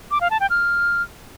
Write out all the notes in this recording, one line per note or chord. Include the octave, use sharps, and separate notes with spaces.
D6
F5
A5
G5
F6